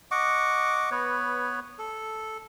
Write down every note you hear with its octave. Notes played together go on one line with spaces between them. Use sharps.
D#5 F#5 C#6 D6
B3 B4 C#5
A4